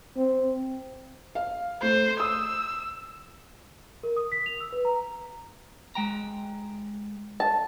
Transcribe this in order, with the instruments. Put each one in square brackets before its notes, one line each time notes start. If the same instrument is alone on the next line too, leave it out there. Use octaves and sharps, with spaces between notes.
[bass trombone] C4
[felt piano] F5
[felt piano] A3 [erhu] C5
[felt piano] D#6 [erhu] E6
[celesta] A#4
D#6
B6
F7
E6
B4
A#5
[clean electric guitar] G#3 G5 A#5
[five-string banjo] A5